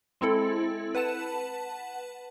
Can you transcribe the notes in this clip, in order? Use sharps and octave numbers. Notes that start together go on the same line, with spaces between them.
G#3 C4 E4 A4
B4 F#5 A5 E7